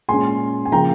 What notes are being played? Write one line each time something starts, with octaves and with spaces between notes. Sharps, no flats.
A#2 G#3 C#4 G#5 C6
G#5
C#3 F3 A#3 G5 A#5